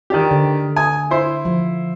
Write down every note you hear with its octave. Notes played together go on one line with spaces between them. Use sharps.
D#3 D4 G4
D3
G#5 D#6
E4 C5
F3